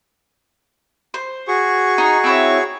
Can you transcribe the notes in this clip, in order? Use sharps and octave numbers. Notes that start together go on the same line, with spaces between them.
C5
F#4 G#4 C#6
D#4
C4 E4 C#5